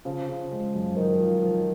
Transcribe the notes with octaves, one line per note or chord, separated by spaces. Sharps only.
C#3 F3
C#3
G#3
F#2
F#2 D#3
F3
F3